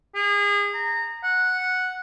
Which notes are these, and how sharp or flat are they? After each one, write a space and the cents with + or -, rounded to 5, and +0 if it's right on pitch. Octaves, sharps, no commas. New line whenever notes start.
G#4 -30
A#5 -20
F#5 -5